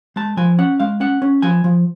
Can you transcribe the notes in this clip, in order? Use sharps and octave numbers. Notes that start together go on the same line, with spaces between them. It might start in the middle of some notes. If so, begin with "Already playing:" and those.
G#3 A5
F3 G#5
C#4 F#5
G#3 F5
C#4 F#5
C#4
F3 G#5
F3